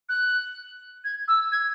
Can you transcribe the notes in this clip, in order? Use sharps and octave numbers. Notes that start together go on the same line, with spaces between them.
F#6
G#6
E6
G#6